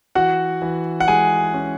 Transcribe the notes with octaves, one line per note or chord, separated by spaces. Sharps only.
E3 F#4 F#5
E3
F#5
G#3 G#4 G#5
C#4